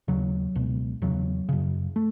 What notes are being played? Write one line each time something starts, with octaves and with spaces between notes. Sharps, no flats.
D#2 C#3 F#3
C#2 B2
E2 C#3 F#3
F#2 C#3
A3